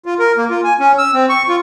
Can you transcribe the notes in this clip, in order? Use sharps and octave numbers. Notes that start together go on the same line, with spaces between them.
F4
A#4
A#3
F4
G#5
C#4
E6
C4
C#6
F4